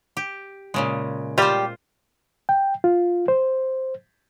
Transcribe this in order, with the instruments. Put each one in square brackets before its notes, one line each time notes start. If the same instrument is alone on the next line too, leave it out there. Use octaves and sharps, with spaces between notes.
[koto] G4
A#2 C#3 G#3
[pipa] G3 G4 [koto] F4 C5
[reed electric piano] G5
F4
C5